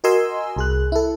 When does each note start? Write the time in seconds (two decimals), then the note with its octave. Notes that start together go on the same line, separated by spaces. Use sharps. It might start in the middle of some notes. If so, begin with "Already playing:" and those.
0.04 F#4 A#4 D#5 G#5 C6 E6
0.56 C2 G#4 F#6
0.92 E4 A4